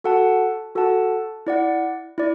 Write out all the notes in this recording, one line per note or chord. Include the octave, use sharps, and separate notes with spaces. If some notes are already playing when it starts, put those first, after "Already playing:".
F#4 A4 F#5 A5
F#4 A4 F#5 A5
E4 D5 F#5
E4 D5